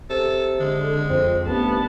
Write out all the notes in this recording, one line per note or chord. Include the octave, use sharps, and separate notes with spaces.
C3 A4
D3 G#3
F2 C4
A1 G2 B3 A5